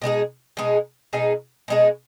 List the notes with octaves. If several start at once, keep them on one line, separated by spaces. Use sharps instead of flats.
B2 G#3 D#4 G#4
B2 G#3 D#4 G#4
B2 G#3 D#4 G#4
B2 G#3 D#4 G#4